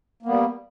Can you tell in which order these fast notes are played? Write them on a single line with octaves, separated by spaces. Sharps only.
A#3 B3 G3